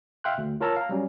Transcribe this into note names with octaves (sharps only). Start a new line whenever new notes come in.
E5 F5 G5 C6 F#6
D2
F4 A#4 C#5 A5 A#5 E6
F5 A#5
F#3 G3 C#4